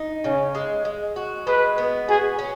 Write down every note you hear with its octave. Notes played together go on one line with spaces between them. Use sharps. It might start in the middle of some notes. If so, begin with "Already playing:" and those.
Already playing: D#4
C#3 C#4
G#3
G#3
F#4
G#3 B4
B3
F#4 G#4
C#4